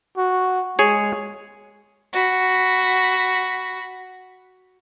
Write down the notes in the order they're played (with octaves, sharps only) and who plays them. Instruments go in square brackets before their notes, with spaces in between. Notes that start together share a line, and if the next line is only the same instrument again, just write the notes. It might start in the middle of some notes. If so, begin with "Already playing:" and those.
[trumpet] F#4
[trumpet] G#3 [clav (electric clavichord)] G#4 C#5
[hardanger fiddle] F#4 B5